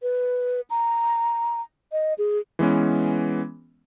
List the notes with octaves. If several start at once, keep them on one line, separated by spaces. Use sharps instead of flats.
B4
A#5
D#5
G#4
E3 G#3 B3 C#4